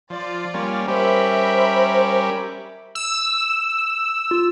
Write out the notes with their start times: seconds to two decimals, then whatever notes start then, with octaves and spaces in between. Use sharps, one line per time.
0.10 F3 F4 D5
0.54 G3 A#3 C#4
0.88 G3 C#4 G4 A#4 C5 E5 B5
2.95 E6
4.31 F4